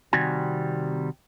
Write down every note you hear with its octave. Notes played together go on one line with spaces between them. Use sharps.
C3 D#3 G3 C4 F#4 G#5